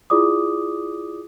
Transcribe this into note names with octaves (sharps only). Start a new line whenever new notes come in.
E4 F4 G#4 D5 D6 D#6